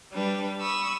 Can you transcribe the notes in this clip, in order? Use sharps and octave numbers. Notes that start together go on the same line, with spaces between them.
G3 D4 B4
B5 C#6 D#6 E6